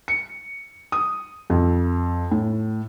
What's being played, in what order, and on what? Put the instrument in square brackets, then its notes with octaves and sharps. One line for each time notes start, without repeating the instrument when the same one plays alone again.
[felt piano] C#7
D#6
F2
A2